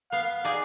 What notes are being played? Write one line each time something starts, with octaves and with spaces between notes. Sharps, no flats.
B3 F5
D#4 G#4 D5